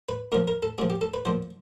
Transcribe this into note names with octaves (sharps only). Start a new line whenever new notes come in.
B4
A#2 F3 A#4
A#4
A4
A#2 F3 G#4
G4
A4
B4
A#2 F3 C5